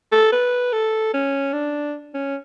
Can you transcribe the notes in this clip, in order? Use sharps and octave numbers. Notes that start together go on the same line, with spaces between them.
A4
B4
A4
C#4
D4
C#4